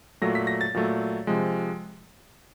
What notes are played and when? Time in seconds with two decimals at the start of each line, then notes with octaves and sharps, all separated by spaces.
0.21 A#2 F#3 A3 A#6
0.35 B6
0.47 A#6
0.61 A6
0.74 A#2 F#3 A3
1.27 C3 F3 G#3